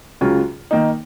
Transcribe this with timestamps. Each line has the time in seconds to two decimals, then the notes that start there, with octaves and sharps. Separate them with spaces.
0.21 C#2 C#3 F#3 C#4 F4
0.71 D#3 A#3 D#4